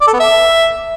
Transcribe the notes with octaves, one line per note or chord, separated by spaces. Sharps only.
D5
A4
B3
E5